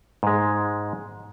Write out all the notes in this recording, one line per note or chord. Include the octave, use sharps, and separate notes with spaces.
G#2 G#3